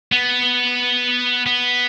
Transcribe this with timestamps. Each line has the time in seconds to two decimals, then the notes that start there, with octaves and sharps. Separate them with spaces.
0.12 B3
1.46 B3